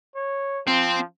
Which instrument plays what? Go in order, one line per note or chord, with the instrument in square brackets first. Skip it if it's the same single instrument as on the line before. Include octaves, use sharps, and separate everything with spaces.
[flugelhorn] C#5
[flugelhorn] F3 [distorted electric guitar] C4